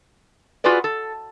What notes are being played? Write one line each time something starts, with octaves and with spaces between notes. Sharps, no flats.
F4 F#4 G#4 B4 D5
A4